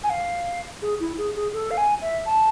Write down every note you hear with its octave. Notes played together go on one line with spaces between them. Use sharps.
G#5
F5
G#4
E4
G#4
G#4
A4
F5
G#5
E5
A5